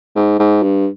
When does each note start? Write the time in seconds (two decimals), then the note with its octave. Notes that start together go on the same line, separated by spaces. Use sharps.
0.16 G#2
0.39 G#2
0.63 G2